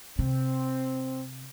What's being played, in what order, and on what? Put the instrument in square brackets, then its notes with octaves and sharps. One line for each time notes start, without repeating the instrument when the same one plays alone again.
[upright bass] C3 [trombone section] C4